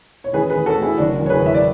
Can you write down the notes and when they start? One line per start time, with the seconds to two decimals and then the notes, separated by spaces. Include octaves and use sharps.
0.24 C#5
0.33 A1 G#4 B4
0.50 G#4 B4
0.56 A1
0.66 F#4 A4
0.76 A2
0.82 E4 G#4
0.98 F#1 D4 F#4
1.20 F#1
1.26 C#5
1.30 G#4 B4
1.41 E2
1.46 E5
1.54 D5